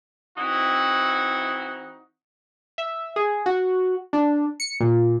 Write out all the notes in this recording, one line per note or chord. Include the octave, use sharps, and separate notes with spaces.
E3 C4 D#4 E4 F#4
E5
G#4
F#4
D4
C#7
A#2